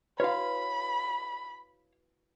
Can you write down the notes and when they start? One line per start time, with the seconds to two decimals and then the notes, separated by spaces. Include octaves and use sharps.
0.20 E4 F#4 B4 C#5 F5 B5